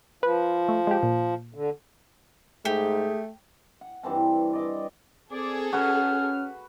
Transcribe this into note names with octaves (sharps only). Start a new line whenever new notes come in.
F3 B4
A3
G#3 G4
A#2
D3
G#2 A3 G4 G#4
F#5
G2 E3 C4 A5
D5 D#5 D6
C4 G#4 A4 D5
C#4 F#4 B4 F6